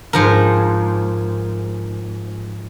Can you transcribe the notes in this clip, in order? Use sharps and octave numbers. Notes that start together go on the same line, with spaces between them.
G#2 F3 A#4